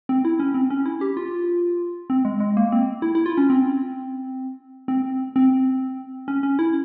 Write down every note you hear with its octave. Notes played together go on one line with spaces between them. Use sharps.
C4
E4
C#4
C4
C#4
E4
G4
F4
C4
G#3
G#3
A#3
C4
E4
E4
F4
C#4
C4
C4
C4
C#4
C#4
E4